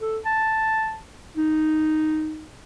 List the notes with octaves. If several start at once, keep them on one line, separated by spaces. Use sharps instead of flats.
A4
A5
D#4